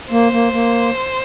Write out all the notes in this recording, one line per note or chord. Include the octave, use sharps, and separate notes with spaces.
A#3 C5
A#3
A#3